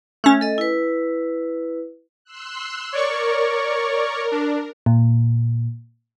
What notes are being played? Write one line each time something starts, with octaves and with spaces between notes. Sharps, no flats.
A3 C#4
A4 D#5
E4 B4
C6 E6 F#6
A#4 C#5 D5 C#6
D4
A#2